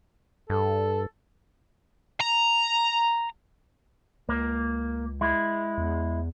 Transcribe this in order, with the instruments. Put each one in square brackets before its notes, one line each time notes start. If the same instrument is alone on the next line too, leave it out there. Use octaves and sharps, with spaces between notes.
[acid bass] G2 [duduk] A4
[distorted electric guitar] A#5
[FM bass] C#2 [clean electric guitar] A#3
[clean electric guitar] G#3 E4
[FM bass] E2